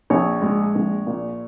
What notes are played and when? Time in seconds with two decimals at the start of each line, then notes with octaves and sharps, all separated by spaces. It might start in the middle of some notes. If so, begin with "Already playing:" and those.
0.10 A#1 C#5
0.42 G#3
0.75 A#1
1.07 A#2